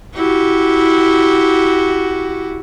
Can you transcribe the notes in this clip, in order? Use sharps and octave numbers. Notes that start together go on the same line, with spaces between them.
E4 F#4 G4